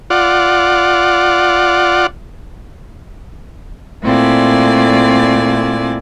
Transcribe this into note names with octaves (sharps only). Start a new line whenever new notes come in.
F4 D5 F#5
A#2 A3 C4 E4 D5 G#5